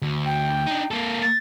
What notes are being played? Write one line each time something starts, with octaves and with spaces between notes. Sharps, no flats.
D2
G5
D4 D#4
A#3 A4
A6